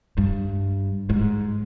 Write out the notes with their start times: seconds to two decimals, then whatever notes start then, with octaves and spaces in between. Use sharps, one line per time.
0.18 G2
1.10 G#2